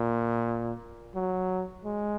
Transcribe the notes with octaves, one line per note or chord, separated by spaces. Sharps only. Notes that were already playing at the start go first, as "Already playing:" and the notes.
Already playing: A#2
F#3
G#3